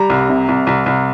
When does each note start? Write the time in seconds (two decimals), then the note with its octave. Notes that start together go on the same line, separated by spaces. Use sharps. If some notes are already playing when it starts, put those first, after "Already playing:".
Already playing: G3 A#5
0.10 C2
0.29 C3
0.49 C2
0.67 C2
0.86 C2